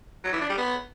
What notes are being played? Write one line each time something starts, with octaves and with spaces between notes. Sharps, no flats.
F#3
E3
D4
G3
B3